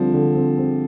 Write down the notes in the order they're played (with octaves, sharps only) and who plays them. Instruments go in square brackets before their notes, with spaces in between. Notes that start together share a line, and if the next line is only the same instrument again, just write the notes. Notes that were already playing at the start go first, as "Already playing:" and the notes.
Already playing: [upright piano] D3 G3 C4 [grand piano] F3
[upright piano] D3
C4
C4